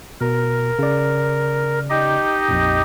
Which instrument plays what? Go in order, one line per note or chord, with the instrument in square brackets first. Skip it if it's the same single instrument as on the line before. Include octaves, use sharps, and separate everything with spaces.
[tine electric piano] B2 [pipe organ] A#4
[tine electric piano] C#3 D5
[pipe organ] D#4 G4 D#5
[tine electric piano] A#1 F2 A#2